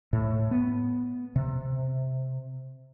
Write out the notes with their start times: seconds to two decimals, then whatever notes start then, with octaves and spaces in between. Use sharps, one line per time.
0.13 A2
0.51 B3
1.36 C3